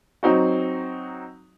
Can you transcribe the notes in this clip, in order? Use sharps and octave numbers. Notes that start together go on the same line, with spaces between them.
F#3 C4 D#4 F#4